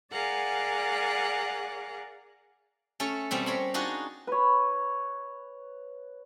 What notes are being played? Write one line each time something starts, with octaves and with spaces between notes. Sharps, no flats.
G#4 A#4 D5 F5 F#5 G#5
A3 C#4 A4 C#5
B2 G3 C4 C#4
A#4 C#5 B5 C6
D4 D#4 F4 F#4 G#4
B4 C#5